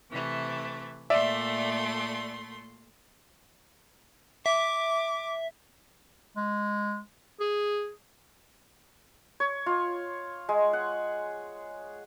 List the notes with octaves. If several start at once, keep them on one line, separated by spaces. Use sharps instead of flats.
C3 E3 A3
A#2 A3 D5 E5 C6
E5 D6
G#3
G#4
C#5
F4
G#3
F#5